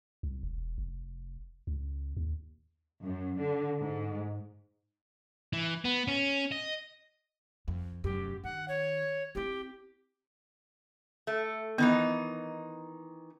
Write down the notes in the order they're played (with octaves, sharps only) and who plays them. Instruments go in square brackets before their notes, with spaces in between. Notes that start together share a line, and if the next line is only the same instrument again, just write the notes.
[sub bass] C2
E1
F1
C#2
D#2
[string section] F#2
D3
G#2
[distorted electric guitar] E3
B3
C#4
D#5
[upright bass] F2
[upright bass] F1 F#2 [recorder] G4
[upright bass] D#3 [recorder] F#5
[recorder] C#5
[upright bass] C4 E4 [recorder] G4
[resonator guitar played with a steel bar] A3
[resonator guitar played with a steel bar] D#3 E3 D#4 [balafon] B3